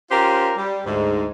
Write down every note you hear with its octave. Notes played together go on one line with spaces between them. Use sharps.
C#4 F4 G4 A#4 C5
G3
D2 G#2